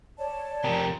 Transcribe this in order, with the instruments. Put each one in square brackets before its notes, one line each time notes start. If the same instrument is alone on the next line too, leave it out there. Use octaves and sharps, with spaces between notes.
[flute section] C#5 D5 A5
[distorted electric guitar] F2 C3 [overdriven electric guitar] G4 A#4